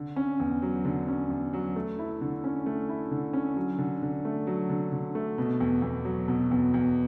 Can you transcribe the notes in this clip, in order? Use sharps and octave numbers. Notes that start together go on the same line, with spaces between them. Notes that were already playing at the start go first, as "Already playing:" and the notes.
Already playing: D3
C#4
E2
F#3
D3
C#4
E2
F#3
A3
E4
D3
C#4
A3
E4
D3
C#4
F#3
D3
D3
A3
F#3
D3
D3
A3
B2
E2
E2
F#3
B2
E2
E2